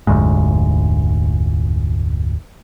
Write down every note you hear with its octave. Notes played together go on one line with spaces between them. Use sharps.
F1 D2 G#2